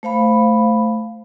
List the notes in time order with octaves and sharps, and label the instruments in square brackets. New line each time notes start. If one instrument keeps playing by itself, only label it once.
[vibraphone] A3 C5 F5 B5